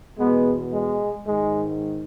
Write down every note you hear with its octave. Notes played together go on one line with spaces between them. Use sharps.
E2 B2 G#3 B3
G#3
G#2 D#3 G#3